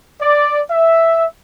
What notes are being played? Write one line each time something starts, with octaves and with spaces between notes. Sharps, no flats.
D5
E5